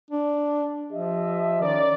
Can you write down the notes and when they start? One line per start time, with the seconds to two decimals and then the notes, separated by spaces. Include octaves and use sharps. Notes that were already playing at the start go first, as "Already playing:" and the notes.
0.11 D4
0.92 F3 G4 D#5 E5
1.61 D#3 C#4 A#4 D5